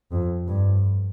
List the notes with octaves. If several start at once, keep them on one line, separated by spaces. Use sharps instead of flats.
F2
G2